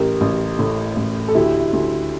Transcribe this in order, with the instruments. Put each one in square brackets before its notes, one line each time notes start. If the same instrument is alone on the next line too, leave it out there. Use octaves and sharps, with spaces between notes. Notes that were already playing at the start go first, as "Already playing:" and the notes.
Already playing: [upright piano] A1 G4 A#4
A1
A2
A1
A4
D2 E4 G4
D2